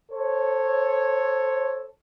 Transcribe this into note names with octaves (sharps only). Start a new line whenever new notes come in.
A4 C5 C#5